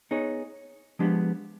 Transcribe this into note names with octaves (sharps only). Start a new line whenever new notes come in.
B3 D#4 G#4 C#5
F3 G#3 B3 D4 G4